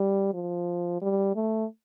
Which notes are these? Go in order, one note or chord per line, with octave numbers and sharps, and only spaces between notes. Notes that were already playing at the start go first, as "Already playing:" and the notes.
Already playing: G3
F3
G3
A3